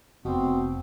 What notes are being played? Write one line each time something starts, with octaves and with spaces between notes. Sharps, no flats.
F1 B2 C4